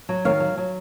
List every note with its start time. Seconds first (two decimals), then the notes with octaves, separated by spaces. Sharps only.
0.09 F#3
0.25 D#3 C#5 F5
0.40 F#3
0.58 F#3